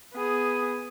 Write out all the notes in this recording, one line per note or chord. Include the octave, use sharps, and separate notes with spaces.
B3 G#4